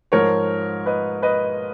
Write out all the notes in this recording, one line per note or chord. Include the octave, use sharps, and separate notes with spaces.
G#2 F3 A#4 C#5
B4 D#5
B4 D#5